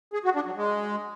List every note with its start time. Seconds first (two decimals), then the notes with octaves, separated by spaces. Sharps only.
0.13 G#4
0.25 F#4
0.35 D4
0.46 F#3
0.57 G#3